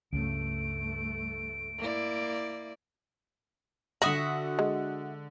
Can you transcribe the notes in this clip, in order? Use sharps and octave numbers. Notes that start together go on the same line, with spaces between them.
C#2 G2 C#3 A3 D7
A#3 E4 D5
D3 F#4 E5 F#5 B5 D#6 A#6
G#3